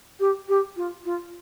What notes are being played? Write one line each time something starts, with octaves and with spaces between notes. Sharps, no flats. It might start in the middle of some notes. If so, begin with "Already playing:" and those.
G4
G4
F4
F4